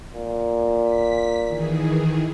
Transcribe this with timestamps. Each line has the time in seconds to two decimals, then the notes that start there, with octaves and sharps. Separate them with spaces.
0.14 A#2
0.84 B6
1.45 D#3 E3 G#4